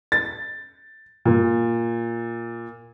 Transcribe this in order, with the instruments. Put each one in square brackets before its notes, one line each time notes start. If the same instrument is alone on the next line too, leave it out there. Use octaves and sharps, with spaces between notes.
[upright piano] A6
A#2